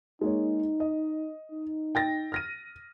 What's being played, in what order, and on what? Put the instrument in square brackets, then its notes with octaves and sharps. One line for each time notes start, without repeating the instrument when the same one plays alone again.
[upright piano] G#3 A#3 C#5 [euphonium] D#4
[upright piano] D#5
[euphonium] D#4
[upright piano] G5 A6 A#6
F6 A#6 D#7